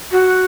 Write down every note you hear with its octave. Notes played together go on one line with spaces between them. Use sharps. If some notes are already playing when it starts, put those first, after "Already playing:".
F#4